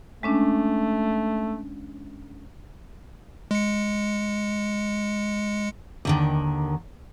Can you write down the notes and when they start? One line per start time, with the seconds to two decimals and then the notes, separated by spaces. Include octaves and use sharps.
0.23 G#3 A3 C#4 D4
3.51 G#3 C#7
6.05 D#2 D3 D#3